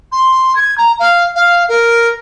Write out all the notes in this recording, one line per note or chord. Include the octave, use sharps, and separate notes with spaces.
C6
G#6
A#5
F5
F5
A#4